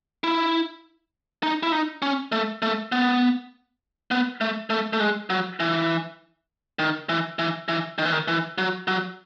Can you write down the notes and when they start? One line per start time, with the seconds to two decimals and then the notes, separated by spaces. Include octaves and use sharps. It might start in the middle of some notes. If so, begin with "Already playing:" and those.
0.24 E4
1.43 D#4
1.63 E4
1.72 D#4
2.02 C#4
2.32 A3
2.62 A3
2.92 B3
4.11 B3
4.41 A3
4.70 A3
4.93 A3
5.00 G#3
5.30 F#3
5.60 E3
6.79 D#3
7.09 E3
7.39 E3
7.68 E3
7.98 D#3
8.05 E3
8.12 D#3
8.28 E3
8.58 F#3
8.88 F#3